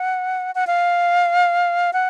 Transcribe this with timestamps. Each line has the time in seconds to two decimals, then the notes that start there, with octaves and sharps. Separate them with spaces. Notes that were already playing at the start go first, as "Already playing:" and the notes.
Already playing: F#5
0.55 F#5
0.67 F5
1.93 F#5